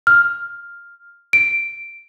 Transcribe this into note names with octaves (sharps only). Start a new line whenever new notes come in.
F6
D7